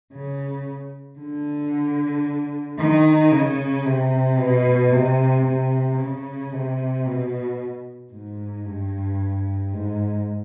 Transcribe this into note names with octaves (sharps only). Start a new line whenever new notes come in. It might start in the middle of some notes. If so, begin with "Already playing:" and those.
C#3
D3
D#3
C#3
C3
B2
C3
C3
C#3
C3
B2
G#2
G2
G#2